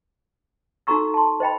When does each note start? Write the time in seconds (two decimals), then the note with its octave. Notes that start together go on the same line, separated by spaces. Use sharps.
0.87 D#4 F#4 A4 A#5 C#6 E6
1.14 A5 C6
1.40 C5 D#5 G5 B5